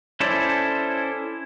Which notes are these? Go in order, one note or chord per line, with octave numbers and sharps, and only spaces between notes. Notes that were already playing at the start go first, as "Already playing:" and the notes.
C#4 E4 A4 C5 D5